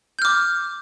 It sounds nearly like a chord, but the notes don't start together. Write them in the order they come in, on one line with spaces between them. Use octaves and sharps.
G6 F6 D6